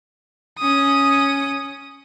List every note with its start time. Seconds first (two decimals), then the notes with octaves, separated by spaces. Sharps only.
0.58 C#4 D#6